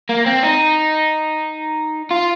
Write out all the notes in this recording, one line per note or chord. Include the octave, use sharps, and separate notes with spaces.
A#3
C4
D#4
F4